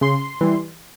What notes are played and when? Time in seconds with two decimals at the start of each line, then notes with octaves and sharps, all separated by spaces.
0.01 C#3 C6
0.41 E3 G3